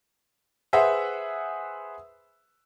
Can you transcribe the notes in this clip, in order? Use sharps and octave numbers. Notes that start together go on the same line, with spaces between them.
G#4 B4 C5 E5 F#5